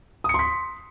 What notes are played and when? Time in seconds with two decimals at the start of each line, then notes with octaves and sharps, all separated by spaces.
0.24 D#6
0.29 C#7
0.34 C6
0.39 B6